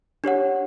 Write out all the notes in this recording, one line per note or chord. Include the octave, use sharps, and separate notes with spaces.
D4 G4 C#5 F#5